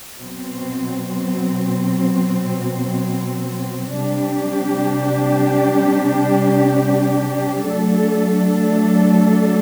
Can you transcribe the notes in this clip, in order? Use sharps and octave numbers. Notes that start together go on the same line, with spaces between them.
B2 F#3 C4
C3 G3 D4 G4
F#3 A3 D4 A4